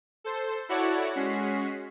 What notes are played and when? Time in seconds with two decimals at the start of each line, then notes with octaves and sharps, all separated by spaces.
0.24 A4 C5
0.69 E4 F#4 A4 C#5 D5 F#5
1.15 G#3 C#4 F#4 B6 C7